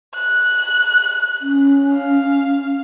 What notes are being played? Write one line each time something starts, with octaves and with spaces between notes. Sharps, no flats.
F#6
C#4
F5